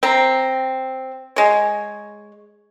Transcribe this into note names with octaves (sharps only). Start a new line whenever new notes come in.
C4 A#5
G#3 C#5